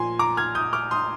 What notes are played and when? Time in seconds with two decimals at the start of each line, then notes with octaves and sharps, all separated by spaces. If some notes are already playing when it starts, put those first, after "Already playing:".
Already playing: A#2 F3 G#5 C6
0.19 A#5 D6
0.37 F6 G#6
0.55 D#6 G6
0.73 D6 F6
0.91 C6 D#6